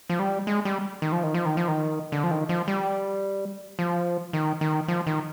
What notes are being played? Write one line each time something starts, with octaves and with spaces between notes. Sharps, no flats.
F3
G3
G#3
G3
D#3
F3
D#3
F3
D#3
F3
D#3
D3
F3
D#3
F3
G3
F3
D#3
D#3
F3
D#3